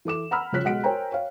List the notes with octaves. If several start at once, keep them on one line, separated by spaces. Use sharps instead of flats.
E3 A4 D6 E7
F#5 A#5 B5 E6 F6
C#3 F3 C#5 F#6 B6
B1 G#3 F#5 B6 D7
A#4 C5 C#5 G5 G#5 A#5
C#5 F5